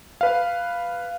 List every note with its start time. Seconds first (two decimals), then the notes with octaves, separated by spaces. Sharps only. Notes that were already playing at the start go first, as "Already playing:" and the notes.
0.21 B4 F5